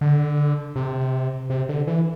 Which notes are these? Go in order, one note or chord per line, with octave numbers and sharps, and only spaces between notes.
D3
C3
C3
D3
E3